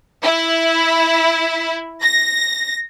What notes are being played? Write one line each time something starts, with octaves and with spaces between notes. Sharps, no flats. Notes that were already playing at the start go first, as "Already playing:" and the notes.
E4
A#6